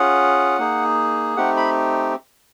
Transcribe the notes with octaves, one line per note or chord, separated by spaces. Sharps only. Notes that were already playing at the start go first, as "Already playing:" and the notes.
Already playing: C#4 F4 G#4 F#5
A#3 D#4 G#4
A3 C4 D#4 G4 F#5
B5